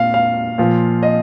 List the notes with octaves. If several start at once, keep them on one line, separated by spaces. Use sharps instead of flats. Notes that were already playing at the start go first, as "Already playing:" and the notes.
Already playing: A#2 F5
F5
A#2 F3
D#5